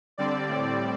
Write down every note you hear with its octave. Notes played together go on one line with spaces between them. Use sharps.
D3 G3 C4 D5
A2 G3 C4